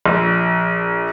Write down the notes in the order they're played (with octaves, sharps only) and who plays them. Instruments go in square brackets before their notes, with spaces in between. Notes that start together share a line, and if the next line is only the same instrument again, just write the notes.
[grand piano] A#1